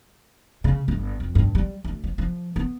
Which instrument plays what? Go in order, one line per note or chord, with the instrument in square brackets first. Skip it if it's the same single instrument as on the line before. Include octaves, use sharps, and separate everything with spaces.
[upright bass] C#3
G1
F2
G2
G3
D2
F3
F3
B3